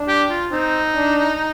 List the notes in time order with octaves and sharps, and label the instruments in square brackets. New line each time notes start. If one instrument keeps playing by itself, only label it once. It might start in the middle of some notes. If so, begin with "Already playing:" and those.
Already playing: [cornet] D4
[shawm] G4
F4
[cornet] C4 [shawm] D#4
[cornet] D4